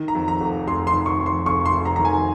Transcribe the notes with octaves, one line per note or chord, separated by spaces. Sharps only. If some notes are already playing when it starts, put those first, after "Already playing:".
Already playing: D#3
A#5
F2
A#5
F1
F1 C6
C6
D#3
C#6
F2
C6
F1 C#6
C6
F1
A#5
D#3 A#5
G#5